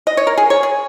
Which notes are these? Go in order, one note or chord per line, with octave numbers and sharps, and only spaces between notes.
D#5
C#5
A#4
G#4
C#5
G#4